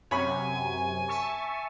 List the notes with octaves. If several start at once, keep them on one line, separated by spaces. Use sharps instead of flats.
F#2 C3 C#5 G#5 B5
E5 A5 C#6